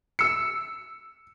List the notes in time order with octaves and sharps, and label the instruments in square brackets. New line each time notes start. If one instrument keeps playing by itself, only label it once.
[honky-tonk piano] E6 C#7